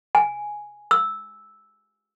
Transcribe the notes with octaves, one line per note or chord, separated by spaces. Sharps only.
G#5
E6